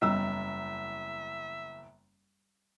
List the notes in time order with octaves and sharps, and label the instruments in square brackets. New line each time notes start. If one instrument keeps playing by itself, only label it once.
[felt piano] F#1 E2 [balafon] G3 [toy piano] C#4 A#5 E6 [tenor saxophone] E5